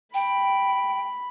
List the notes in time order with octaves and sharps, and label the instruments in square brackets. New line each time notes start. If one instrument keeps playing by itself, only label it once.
[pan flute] G5 [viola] B5